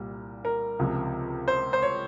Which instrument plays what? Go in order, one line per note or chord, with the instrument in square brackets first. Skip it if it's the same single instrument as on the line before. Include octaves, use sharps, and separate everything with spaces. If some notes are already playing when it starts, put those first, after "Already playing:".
Already playing: [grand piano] C2 A#2 G3
A#4
C#2 C3 F3
C5
C5
C#5